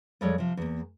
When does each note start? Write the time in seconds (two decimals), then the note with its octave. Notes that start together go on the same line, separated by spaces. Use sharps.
0.21 F2 G3 G#3 A4 C#5 D5
0.38 C3 F3
0.57 E2 A#3